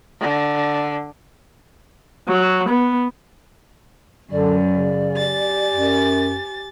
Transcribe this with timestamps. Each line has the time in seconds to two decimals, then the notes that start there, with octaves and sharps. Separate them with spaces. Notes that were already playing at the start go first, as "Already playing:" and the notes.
0.21 D3
2.29 F#3
2.69 B3
4.31 F#2 D3 D5
4.70 C#3
5.15 G4 G#5 A6
5.73 F#2